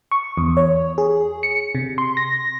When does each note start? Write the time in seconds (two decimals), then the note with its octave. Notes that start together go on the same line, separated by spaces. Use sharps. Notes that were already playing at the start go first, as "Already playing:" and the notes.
0.12 C#6
0.37 E2
0.57 C#5
0.98 G#4
1.43 C#7
1.75 C3
1.98 C6
2.17 A#6